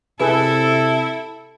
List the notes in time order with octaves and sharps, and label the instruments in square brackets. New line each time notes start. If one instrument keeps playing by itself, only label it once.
[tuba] C3 [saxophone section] E4 [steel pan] G#4 B4 [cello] A4